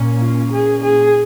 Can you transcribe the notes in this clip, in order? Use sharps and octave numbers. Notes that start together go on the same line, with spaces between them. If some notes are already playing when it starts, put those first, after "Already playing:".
Already playing: A#2 A#3 C#4
F4
G#4
G#4